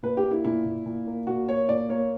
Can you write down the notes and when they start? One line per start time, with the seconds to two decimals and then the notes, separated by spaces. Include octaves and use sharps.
0.03 A#2 B4
0.17 G4
0.23 A#3
0.31 E4
0.44 A#2 E4
0.65 A#2
0.86 A#2
1.07 A#3
1.27 A#2 F#4
1.49 A#3 C#5
1.69 A#2 D5
1.89 A#3 C#5